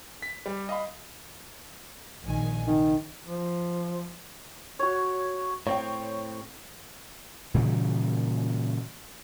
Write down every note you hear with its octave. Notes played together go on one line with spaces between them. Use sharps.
B6
G3
D#5 F5 B5
A#1 D#3 G#5
C3 D#3
F3
F#4 C#5
A2 C4 C#5 G5
A#2 C#3 E3 G3